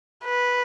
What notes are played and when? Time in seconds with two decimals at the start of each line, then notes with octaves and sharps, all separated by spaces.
0.25 B4